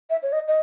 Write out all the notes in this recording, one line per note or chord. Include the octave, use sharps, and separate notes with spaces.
E5
C#5
D#5
D#5